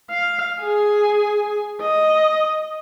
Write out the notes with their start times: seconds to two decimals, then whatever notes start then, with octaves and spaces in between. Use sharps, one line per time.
0.11 F5
0.60 G#4 G#5
1.81 D#5